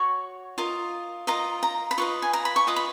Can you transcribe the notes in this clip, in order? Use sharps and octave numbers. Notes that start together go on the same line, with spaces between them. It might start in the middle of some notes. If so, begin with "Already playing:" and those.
Already playing: F#4 C#5 C#6
F4 A#4 D#5
F4 A#4 D#5 A#5
A#5
B5
F4 B4 D#5 C#6
G#5
A#5
B5
C#6
F4 B4 D#5 D#6
B5